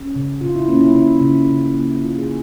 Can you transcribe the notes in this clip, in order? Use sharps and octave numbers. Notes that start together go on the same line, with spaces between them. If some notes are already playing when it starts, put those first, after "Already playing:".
Already playing: C#4
C#3
C#3 F4
E4
A#3 C#4
E4
C#3 E4
C#3
C#3
A#3
C#3 F4
G#4
A#3